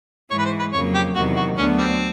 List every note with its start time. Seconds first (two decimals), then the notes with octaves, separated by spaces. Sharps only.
0.31 G#2 E3 G#3 C#5
0.39 B4
0.45 C5
0.59 B4
0.73 F2 C#3 F#3 A#3 C#5
0.95 G4
1.15 E2 C3 D#3 F#3 F#4
1.36 F#4
1.57 D2 D3 F#3 B3 C#4 D4
1.78 G3 C4